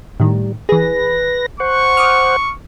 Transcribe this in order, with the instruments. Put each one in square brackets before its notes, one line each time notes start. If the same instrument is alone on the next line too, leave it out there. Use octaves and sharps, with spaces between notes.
[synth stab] A2 D#3 [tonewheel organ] G3
[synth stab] E3 G#4 [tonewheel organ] B4 A#6
[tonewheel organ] C5 F#5 [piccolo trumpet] C#6
[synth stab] D6 D#6 F6